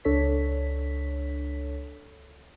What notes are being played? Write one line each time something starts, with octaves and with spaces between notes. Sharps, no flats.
C#2 D4 A4 C#5 B6